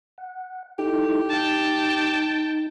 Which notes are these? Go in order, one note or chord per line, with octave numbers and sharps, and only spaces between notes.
F#5
D#4 E4 G4 A4
D#4 G5 A5